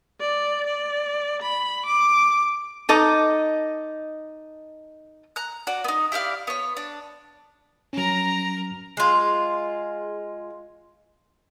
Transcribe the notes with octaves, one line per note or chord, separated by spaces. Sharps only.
D5
D5
B5
D6
D#4 A4 D#5 D6
A#5 F#6
F#4 D5
B3 D#4
E4 G4 D5 F5
B3 C#5
D4
F#3 C#4 A#4 A#5
G#3 F4